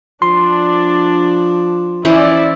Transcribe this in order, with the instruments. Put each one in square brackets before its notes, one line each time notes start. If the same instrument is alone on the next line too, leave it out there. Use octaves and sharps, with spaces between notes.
[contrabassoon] F3 [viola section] D4 [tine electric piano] C6
[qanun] E3 C#4 C5 [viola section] E4 D5